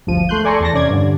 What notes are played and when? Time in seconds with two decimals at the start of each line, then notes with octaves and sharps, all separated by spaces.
0.07 G1 D2 F3 D#7
0.29 A3 C6 F#6 G6
0.44 A4 D5 G#5 A#5 C6 C#6
0.60 E2 A5 A#6
0.73 C3 C#4 D5 G#6
0.89 G2 D3